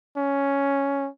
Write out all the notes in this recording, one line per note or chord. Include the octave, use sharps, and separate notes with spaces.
C#4